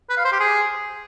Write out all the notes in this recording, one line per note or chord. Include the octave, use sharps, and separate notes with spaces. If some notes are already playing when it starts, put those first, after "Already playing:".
B4
F5
C5
G4
G#4